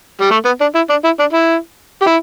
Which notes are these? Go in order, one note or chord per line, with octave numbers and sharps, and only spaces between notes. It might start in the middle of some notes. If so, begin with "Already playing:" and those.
G3
A3
B3
D4
E4
D4
E4
D4
E4
G4
E4